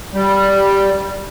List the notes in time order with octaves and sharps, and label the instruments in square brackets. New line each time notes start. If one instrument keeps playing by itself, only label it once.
[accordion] G3